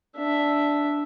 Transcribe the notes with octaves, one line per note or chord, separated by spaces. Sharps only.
D4 E5